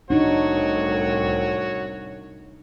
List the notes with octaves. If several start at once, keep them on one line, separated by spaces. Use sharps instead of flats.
C2 A2 D4 D#4 F#4 C#5